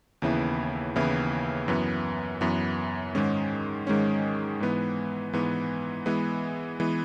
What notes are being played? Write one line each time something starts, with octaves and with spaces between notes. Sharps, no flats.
D#2 C#3 E3 B3 E4
D#2 C#3 E3 B3 E4
F#2 E3 B3
F#2 E3 B3
G#2 D#3 G#3 C#4
G#2 D#3 G#3 C#4
G#2 E3 B3
G#2 E3 B3
E3 G#3 B3
E3 G#3 B3